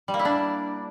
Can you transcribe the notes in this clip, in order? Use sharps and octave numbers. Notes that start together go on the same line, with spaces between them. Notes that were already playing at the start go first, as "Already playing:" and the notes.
G3
A#3
E4
D4